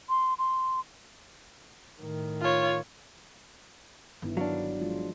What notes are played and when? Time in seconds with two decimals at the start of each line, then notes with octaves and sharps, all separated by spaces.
0.09 C6
0.39 C6
2.01 A2 D#3
2.41 F4 C#5
4.22 G1 D#3 B3 E4
4.37 F#3 D4 F5
4.81 F3 G#3 F4